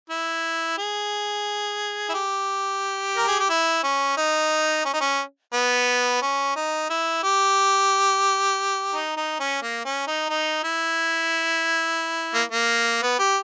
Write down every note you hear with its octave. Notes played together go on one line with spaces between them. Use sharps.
E4
G#4
E4
G4
A#4
G#4
G4
E4
C#4
D#4
C#4
D#4
C#4
B3
C#4
D#4
E4
G4
D#4
D#4
C#4
A#3
C#4
D#4
D#4
E4
A#3
A#3
B3
G4